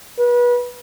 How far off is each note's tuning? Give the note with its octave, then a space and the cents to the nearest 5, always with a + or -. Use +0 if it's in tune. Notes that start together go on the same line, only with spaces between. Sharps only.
B4 -30